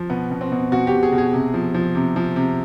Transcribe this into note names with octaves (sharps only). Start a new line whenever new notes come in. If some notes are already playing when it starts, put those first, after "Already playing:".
Already playing: F3
B2 B3
B2
C4
B2
B2 F#4
B2 G4
G#4
B2
G#4
C3
F3
F3
C3
F3
C3